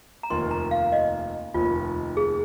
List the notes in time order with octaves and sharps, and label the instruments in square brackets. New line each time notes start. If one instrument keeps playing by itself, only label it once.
[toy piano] A#5
[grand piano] F1 D#2 D#3 A#3 F4 [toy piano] C6
[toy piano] A#5
F5
D#5
[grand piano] F1 D#2 D#3 [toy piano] F4
[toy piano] G#4